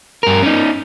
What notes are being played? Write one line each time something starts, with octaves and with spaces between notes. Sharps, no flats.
G2 A#4
C#4 D#4